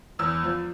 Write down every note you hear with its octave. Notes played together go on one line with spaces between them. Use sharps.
E2 E6
F3